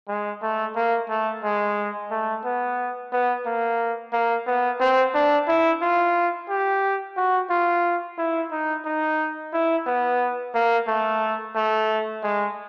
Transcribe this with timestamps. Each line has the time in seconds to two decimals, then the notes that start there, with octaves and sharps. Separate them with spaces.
0.08 G#3
0.42 A3
0.76 A#3
1.10 A3
1.44 G#3
2.11 A3
2.45 B3
3.12 B3
3.46 A#3
4.13 A#3
4.47 B3
4.80 C4
5.15 D4
5.48 E4
5.82 F4
6.50 G4
7.17 F#4
7.50 F4
8.18 E4
8.52 D#4
8.85 D#4
9.53 E4
9.87 B3
10.54 A#3
10.88 A3
11.55 A3
12.23 G#3